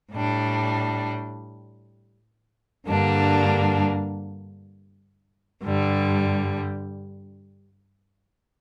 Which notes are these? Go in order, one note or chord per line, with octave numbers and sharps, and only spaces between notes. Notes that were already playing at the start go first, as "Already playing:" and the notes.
A2 G3 D4
G2 D3 G3 A#3 D4
G2 D3 G3